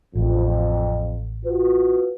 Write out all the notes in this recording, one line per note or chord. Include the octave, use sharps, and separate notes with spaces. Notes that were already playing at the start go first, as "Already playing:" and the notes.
A1 F2
F4 F#4 B4